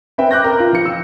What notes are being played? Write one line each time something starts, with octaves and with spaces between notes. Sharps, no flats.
C4 B4 E5 G5
D6 F#6 G6 A#6
A#4
F4
F3 C#7
E6